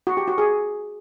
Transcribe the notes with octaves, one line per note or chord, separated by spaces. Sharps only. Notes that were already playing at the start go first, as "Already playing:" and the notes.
F#4
G4
F#4
G#4